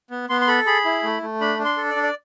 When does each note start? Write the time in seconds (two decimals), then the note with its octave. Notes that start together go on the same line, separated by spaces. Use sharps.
0.10 B3
0.29 B3 C6
0.41 C6
0.47 A4 B5
0.66 G#4 B5
0.85 E4
1.04 A3
1.22 A3
1.41 D4 B5
1.59 D4
1.65 C6
1.77 A4
1.90 D5
1.96 D4
2.03 D5